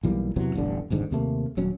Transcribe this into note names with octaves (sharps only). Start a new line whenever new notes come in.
B1 E3 G3 A#3
E2 C3 E3 F#3
E1 A1 G2 D3
D#1 G#1 G#2 D3
D#2 C3 A3 A#3
D#1 F#3 C#4